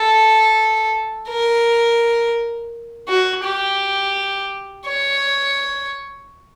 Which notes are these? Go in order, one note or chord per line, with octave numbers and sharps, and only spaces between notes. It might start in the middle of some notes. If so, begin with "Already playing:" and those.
Already playing: A4
A#4
F#4
G4
C#5